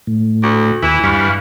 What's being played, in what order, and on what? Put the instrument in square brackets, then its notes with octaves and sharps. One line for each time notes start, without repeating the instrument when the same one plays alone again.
[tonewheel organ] A2
[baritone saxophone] D2
[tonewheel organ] D#2 [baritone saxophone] E3 [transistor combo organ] E4
[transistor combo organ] G2 [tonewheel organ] F5 B5 C#6